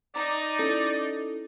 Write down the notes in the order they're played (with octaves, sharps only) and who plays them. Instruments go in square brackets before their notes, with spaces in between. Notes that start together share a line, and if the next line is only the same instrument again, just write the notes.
[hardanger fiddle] D#4 D#5 [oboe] D5 [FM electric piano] A#5 D6
[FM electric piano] C#4 E4 A4